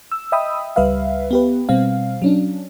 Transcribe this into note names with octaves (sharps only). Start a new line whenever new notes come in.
E6
D#5 E5 G5 B5 D#6 E6
C#2 G3 B4 E5 F5
B3 G4 B4
B2 G3 C4 F5
F#3 C#4 D4